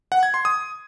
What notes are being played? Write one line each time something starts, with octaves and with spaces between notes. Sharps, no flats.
F#5
G#6
C6
D#6